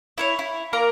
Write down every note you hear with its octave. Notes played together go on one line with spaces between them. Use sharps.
E4 A4 C#5
E4
A#3 A#4 A#5